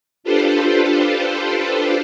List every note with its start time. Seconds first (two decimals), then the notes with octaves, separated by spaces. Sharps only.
0.24 D4 F4 G4 A4 B4 C5